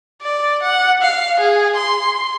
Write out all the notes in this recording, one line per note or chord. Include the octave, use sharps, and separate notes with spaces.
D5
F#5
F5
G#4
C6